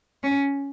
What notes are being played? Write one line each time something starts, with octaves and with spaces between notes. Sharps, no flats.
C#4